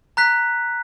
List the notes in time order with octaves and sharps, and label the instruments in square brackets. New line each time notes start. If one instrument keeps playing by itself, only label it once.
[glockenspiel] A#5 F#6 B6